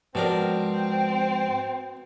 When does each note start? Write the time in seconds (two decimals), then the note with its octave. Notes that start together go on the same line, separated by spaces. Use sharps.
0.15 G#2 B2 F3 G#3 C4 D4 A#4